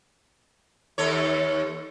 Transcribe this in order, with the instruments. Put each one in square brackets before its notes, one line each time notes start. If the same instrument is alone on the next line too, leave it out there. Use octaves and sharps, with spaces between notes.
[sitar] D#2 A4 C#5